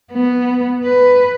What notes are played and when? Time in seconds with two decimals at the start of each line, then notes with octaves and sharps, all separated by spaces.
0.12 B3
0.84 B4